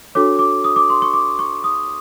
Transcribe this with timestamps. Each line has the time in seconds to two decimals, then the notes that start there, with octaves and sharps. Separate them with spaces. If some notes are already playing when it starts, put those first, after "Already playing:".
0.15 D4 F#4 A4 C#5 D6
0.39 D6
0.64 D#6
0.76 D6
0.90 C6
1.02 C#6
1.13 D6
1.39 C#6
1.64 D#6